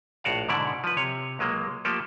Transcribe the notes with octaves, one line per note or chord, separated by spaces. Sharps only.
A#1 A2 F#4 D5 F5
G#2 B2 D3 E4 D5
F3 B4
C3 C#5
C#2 F#3 G#3 A#3
F3 A3 A#3 G4 A4